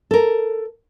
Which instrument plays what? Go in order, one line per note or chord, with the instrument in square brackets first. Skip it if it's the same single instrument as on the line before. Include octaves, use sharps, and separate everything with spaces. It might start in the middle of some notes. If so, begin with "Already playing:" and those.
[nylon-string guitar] A4 A#4